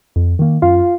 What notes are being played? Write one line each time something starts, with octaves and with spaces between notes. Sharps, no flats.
F2
D#3 A#3
F#2 F4 F5